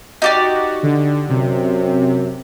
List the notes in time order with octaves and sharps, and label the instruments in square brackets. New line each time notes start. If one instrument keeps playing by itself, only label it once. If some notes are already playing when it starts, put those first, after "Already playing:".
[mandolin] D#4 G4 D5 [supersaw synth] F#4
[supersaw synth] D3
[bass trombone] F#2 [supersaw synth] C3